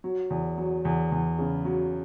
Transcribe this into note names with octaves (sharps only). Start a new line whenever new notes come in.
F#3
E2
F#3
E2
E2
C#3
F#3